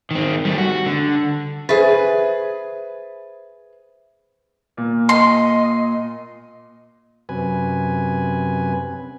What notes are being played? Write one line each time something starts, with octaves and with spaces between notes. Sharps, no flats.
D#3 C4
G3 A3
F#4
D3
G#4 B4 C5 E5 A6
A#2
D#5 C6
F#2 C3 B4 G#5